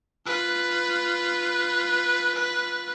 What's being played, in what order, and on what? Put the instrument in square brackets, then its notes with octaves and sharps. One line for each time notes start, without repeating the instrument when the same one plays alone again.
[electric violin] F4 B4